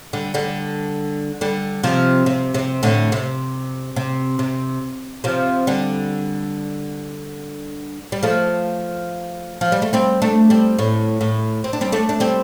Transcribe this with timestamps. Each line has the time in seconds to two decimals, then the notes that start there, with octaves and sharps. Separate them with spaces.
0.13 D3 G3
0.34 D3 G3
1.41 D3 G3
1.83 C3 F3
2.26 C3
2.54 C3
2.83 A2 D3
3.12 C3
3.96 C3
4.39 C3
5.24 C3 F3
5.67 D3 G3
8.12 G3
8.23 F3 A3
9.61 F3
9.72 G3
9.82 A3
9.93 G3 C4
10.22 A3 D4
10.50 G3 C4
10.79 A2
11.21 A2
11.64 C4
11.73 D4
11.81 G3 C4
11.92 A3 D4
12.09 D4
12.20 G3 C4